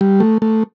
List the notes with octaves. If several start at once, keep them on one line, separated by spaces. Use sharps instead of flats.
G3
A3
A3